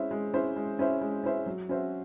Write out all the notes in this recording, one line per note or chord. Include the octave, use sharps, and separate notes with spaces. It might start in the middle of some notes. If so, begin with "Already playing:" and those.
Already playing: G#3 C#4 E4 C5 E5
G#3
C#4 E4 C5 E5
G#3
C#4 E4 C5 E5
G#3
C#4 E4 C5 E5
F#3
C#4 F#4 C5 E5